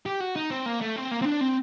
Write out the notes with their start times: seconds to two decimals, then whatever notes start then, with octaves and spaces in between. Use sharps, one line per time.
0.06 G4
0.20 F#4
0.36 D#4
0.50 C4
0.66 A#3
0.81 A3
0.96 C4
1.11 A#3
1.22 C4
1.25 D4
1.41 C4